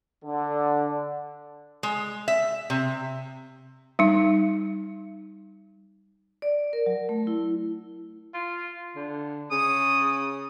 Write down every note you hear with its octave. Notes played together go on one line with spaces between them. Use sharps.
D3
G#3
E5
C3
G3 D#4
D5
A#4
F#3
A3
E4
F4
D3
C#3 D#6